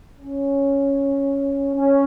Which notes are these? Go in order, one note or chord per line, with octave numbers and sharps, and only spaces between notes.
C#4
C#4